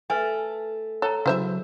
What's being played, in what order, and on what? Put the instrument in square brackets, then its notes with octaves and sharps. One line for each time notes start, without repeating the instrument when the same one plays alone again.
[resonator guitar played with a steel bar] A3 [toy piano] B4 G#5
[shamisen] A4 [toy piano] C#5 A#5
[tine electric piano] C#3 F#3 [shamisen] E4 C5 E5